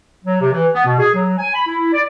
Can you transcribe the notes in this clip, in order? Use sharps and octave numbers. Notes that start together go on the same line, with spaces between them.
F#3
C3
E3
B3
B2
G#4
F#3
G#5
B5
E4
D5